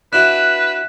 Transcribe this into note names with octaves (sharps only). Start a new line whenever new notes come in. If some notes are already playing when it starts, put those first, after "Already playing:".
D4 E4 F#4 B4 F#6